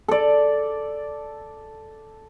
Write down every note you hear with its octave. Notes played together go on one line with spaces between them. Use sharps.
A4 D5